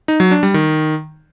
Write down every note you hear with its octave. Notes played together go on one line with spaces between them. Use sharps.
D#4
F#3
D4
G3
D#3